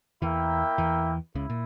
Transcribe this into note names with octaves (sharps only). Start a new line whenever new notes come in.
E2 E3 A#3 E4 A#4 E5 G5
E2 E3
C#2 C#3 E4
A#2